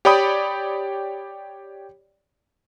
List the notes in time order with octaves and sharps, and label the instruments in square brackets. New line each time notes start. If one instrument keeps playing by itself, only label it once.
[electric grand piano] G4 C#5 D5 G5 B5 D#6